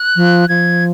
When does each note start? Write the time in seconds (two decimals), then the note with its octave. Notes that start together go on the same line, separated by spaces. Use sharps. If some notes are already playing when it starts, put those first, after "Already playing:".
Already playing: F#6
0.16 F3
0.49 F3 G#6